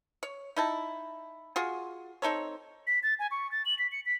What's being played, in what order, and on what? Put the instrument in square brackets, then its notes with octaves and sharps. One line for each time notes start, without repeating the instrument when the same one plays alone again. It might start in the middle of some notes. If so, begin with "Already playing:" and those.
[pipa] C#5
D#4 E4 A5
F4 F#4 G#4
C4 D#4 A4 C#5
[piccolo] B6
A6
G#5
C#6
A6
F#7
B6
C#7
B6